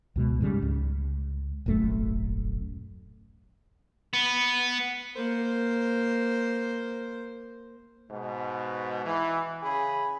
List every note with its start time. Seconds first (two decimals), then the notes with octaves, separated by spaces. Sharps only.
0.16 C#2 B2 G#3
0.41 G#2 C#3 G3
0.62 C#2
1.66 D#1 G#1 F#2 A3
4.13 B3
5.16 A#3 C5
8.10 G#2 B2
9.06 E3
9.63 C#3 G#4 B5